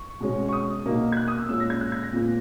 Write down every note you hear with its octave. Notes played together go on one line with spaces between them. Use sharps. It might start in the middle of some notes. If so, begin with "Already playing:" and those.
Already playing: C#6
B2 G#3 C#4
C#6
D#6
B2 A#3 D#4
G#6
F#6
D#6
E6
A#2 G#3 C#4 E6
A#6
G#6
F#6
G#6
A#6
A#2 G#3 B3